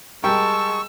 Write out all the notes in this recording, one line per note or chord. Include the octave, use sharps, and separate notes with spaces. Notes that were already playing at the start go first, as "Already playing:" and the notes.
G3 G#3 A#4 G5 A5 C#6 E6